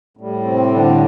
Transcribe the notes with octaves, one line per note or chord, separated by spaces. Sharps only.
A2 G3
C3 C4
D3 D4